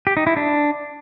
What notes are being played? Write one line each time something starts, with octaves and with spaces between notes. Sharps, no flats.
G4
D#4
E4
D4